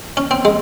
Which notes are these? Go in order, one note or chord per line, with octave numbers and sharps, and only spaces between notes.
C#4
C4
G#3